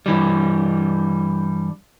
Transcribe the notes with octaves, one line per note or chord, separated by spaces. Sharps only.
G2 E3 G3